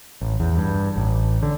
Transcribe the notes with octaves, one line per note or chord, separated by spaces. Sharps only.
A1
E2
G2
A1
D3